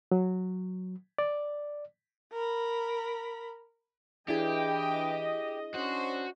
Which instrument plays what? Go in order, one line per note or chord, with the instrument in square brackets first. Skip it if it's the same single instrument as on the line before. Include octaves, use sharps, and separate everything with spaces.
[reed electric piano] F#3
D5
[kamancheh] A#4 B5
[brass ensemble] E3 G5 [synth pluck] D4 E4 G#4 [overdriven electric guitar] G4 [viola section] D#5
[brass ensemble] C#4 D4 C5 [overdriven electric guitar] F#4